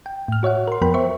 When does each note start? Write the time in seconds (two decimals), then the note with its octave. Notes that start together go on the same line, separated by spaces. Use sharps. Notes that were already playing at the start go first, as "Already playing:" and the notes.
0.06 G5
0.28 A2 F6
0.43 F#4 C#5 E5 F#5
0.68 A#4 C6
0.81 F2 F3 B3 A#4 G5 B5
0.94 C5 E5 C#6